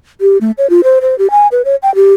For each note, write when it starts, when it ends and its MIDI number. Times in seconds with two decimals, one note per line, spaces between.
0.21 0.38 67
0.41 0.51 57
0.58 0.69 73
0.70 0.81 65
0.84 0.99 72
1.01 1.17 72
1.18 1.30 67
1.31 1.47 80
1.52 1.62 71
1.65 1.76 73
1.83 1.94 79
1.95 2.14 67